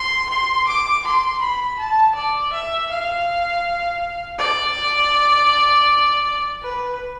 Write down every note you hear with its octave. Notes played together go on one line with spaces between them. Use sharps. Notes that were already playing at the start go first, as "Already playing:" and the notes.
Already playing: C6
C6
D6
C6
B5
A5
D5
E5
F5
D5
B4